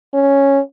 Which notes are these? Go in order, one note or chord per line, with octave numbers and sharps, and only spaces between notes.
C#4